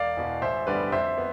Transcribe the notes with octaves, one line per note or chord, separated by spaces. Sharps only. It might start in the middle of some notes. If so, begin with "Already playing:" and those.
Already playing: E1 D5 F5
E2 B2
A1 C5 E5
G2 D3 G3 B3 B4 D5
F2 C5 E5
B3